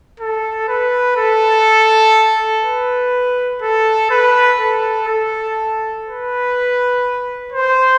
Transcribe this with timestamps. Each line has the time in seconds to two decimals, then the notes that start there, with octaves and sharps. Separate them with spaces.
0.20 A4
0.68 B4
1.17 A4
2.63 B4
3.62 A4
4.10 B4
4.59 A4
5.07 A4
6.06 B4
7.52 C5